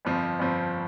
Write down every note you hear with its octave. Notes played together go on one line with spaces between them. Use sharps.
G1 F2 F3 C4
G1 F2 F3 C4